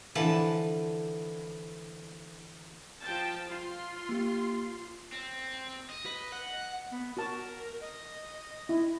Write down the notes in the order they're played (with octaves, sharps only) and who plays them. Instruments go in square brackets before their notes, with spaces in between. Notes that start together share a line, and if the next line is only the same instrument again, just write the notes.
[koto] D3 E3 F3 B4 A5
[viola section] F3 G5 A5
F4 C6
[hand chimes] A#3 G4
[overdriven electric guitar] C4
D#5
[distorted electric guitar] B4
F#5
[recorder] B3
[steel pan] F#4 A5 [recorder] A#4
[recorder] D#5
[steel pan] E4